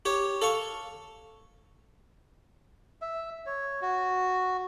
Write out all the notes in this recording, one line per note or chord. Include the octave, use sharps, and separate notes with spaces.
G4 C#5
A4 F5 C#6
E5
C#5
F#4